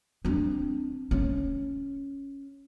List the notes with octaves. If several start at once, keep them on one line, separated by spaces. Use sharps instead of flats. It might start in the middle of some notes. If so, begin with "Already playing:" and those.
C4 D4
C#4